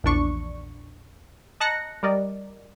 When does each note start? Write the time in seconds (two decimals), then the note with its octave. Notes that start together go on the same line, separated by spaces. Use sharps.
0.04 A#1 E2 D4 C#6
1.60 D#5 A5 A#5 F#6 A#6 C#7
2.03 G3 A#4 D5 D#5